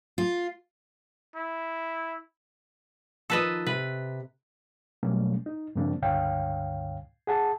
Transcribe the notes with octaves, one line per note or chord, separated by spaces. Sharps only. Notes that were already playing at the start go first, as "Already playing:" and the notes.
F4
E4
D#3 F3 D#4 A4 B4 D#5
C3 B4
B2 F#3 G3 A3 A#3 C#4
D#4
G2 C#3 F3 A#3 C4 D4
C#2 G2 D3 C#5 F5 G5
G#4 F#5 A5